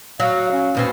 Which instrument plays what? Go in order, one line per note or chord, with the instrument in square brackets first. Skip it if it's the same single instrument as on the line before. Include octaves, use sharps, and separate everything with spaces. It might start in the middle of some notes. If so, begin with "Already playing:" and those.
[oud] F#3 [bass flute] F5
[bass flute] C#4
[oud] D#2 B2 C4